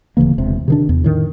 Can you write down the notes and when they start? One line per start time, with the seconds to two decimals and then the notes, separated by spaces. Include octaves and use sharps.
0.17 D1 C#3 E3 A#3
0.38 E1 C3
0.68 C3 D#3 D4
0.89 E2
1.04 A2 D#3